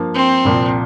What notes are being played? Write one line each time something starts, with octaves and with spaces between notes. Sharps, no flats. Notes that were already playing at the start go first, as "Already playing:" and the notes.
Already playing: G2 F3 A#3
C4
C2 A#2 F3